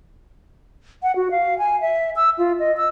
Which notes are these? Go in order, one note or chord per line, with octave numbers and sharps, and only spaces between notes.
F#5
F#4
F5
G#5
E5
E6
F4
D#5
E6